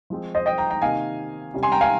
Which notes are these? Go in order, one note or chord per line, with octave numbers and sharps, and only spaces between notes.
F3 G#3 C4
C5 D#5
D#5 G5
G5 A#5
G5 A#5
C3 D#3 A#3 D#4 F5 G#5
C3 G3 C#4
G#5 C6
G5 A#5
F5 G#5